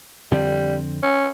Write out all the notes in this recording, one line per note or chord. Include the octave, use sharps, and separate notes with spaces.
F2 D3 G3 C4
C#4